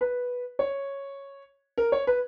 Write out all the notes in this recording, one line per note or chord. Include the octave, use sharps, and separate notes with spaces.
B4
C#5
A#4
C#5
B4